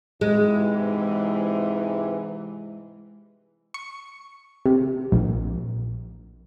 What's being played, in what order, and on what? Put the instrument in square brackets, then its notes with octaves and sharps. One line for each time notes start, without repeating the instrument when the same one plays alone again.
[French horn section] G#2 C3 E3 [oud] G#3
[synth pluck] C#6
C3
A#1